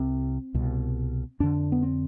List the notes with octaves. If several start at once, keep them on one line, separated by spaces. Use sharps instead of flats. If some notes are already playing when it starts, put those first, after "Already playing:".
Already playing: C2 C3 C4
C2 B2
F2 D3 D4
B3
C4